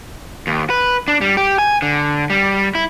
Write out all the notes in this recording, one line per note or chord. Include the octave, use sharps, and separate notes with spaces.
D#2
B4
D4
G3
G4
G#5
D3
G3
E4